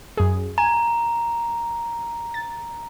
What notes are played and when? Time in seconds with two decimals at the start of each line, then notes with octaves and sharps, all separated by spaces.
0.17 F#2 G#4
0.58 G#5 A#5
2.34 A6